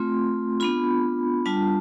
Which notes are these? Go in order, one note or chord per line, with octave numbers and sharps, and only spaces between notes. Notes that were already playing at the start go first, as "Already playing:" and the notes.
Already playing: A3 C4 F4 C6
B3 D4 F4 B5
G3 D4 F4 A5